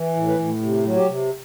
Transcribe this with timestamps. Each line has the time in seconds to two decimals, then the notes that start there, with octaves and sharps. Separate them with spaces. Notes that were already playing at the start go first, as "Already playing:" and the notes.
Already playing: E3
0.16 A2
0.27 B4
0.39 A2
0.62 C3
0.85 F#3
0.97 G4
1.08 C3